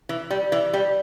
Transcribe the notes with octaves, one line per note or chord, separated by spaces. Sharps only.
E3
G3
E3
G3